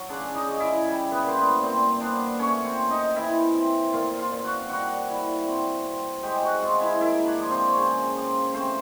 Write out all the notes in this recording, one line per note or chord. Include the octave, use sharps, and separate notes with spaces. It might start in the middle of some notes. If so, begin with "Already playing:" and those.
Already playing: F#3
C#3 D4 D5
D5
D#4 D#5
C#3
E4 E5
G3
B3 B4
A#2 C5
B3 B4
A#2 C4 C5
B3 D4 D5
A3 C#4 C#5
C4 C5
C4
D#4 D#5
E3 E4 E5
C4
A#2 F4 F5
F4 F5
A#2
F#4 F#5
G3 F#4 F#5
E4
C4
C4
G#3 G4 G5
F#4 F#5
G#3 F4 F5
E4 E5
A#3 E4 E5
D4 D5
F3
C4 C5
C#5
C#3 C4 C5
F3
A3 C4 C5